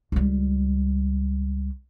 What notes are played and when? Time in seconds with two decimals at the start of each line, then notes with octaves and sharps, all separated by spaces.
0.12 C#2 G3